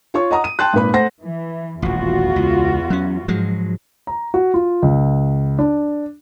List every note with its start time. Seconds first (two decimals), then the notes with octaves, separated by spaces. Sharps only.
0.14 F4 C#5 C#6
0.31 D#5 F#5 A#5 D#6
0.44 D#7
0.59 G5 A5 C6 F#6
0.73 G#1 A#2 B4 B5
0.93 A3 C5 F#5 C6 A#6
1.23 E3
1.82 D#1 A1 E2 F4 F#4
2.36 C#2
2.90 F#3 C#4
3.28 G#2 F3 F#3 G#3
4.07 A#5
4.34 F#4
4.54 F4
4.82 C#2
5.59 D4